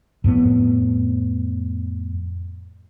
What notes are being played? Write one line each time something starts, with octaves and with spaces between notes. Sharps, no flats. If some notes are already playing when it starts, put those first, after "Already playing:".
F2 A2 B3